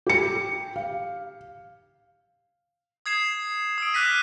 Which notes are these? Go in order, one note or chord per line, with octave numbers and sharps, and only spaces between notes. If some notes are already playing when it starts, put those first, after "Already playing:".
G4 C#7
F5
D#6 G#6 C7 E7
D#6 E6 D7
D6 F6 F#6 A#6 B6 D#7